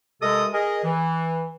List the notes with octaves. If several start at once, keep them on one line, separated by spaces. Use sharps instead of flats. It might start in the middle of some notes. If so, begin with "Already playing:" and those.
C3 G#3 A4 A#4 D#5 D#6
G#4 A#4 D#5
E3